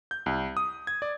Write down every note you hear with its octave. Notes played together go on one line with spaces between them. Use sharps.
G6
C2
D#6
G#6
D5